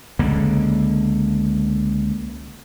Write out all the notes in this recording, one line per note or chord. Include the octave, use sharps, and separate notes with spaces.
C#2 D3 A#3